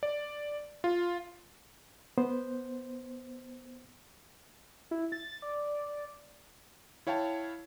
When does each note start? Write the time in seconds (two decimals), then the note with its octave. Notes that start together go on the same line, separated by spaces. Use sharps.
0.03 D5
0.84 F4
2.18 B3 C5
4.91 E4
5.12 A6
5.42 D5
7.07 E4 C#5 F5 G5 A5